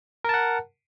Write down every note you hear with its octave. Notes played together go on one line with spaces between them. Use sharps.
A#4 F#5 A5